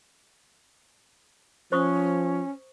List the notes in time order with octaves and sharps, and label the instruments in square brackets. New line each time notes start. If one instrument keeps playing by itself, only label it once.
[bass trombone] F3 [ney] C#4 [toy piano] C5 C#6 D#6